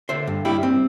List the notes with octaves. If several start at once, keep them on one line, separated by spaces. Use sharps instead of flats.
D3 C5 E5
G2
G3 E4 G4
C4